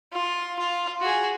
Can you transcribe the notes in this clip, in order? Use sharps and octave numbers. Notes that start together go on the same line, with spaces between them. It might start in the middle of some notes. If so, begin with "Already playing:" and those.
F4
F4
F#4 G#4